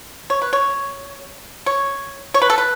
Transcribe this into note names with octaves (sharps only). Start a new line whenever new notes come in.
C#5
B4
C#5
C#5
C#5
B4
A4
B4